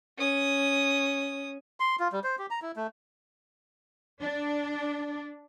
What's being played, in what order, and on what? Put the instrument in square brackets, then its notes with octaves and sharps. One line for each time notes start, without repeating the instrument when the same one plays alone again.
[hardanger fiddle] C#4 D#6
[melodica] C6
F4
G3
C5
G4
A#5
E4
A3
[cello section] D4